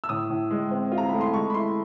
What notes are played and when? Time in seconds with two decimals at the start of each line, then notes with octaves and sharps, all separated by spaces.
0.04 E6
0.09 A2 D#6
0.30 A2
0.51 G#3
0.71 C4
0.92 F4
0.98 A#5
1.09 A3 B5
1.21 C6
1.33 G#3 C#6
1.50 B5
1.54 E4 C6